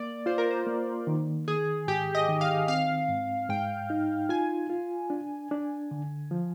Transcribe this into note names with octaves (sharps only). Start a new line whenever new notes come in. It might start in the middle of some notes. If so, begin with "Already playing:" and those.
Already playing: A#3 D5
F4 C5
A#4
C5
A#3
D#3
D#3 G#4
G#2 G4
D#5
D#3
F5
C4 F5
G#2
G#2 G5
D#4
F4 G#5
F4
D4
D4
D3
F3